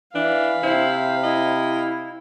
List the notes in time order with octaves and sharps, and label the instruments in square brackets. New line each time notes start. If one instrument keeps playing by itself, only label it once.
[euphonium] E3 [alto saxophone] D4 [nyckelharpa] F5 B5
[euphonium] C3 [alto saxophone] E4 [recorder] C5
[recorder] E4 [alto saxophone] D#5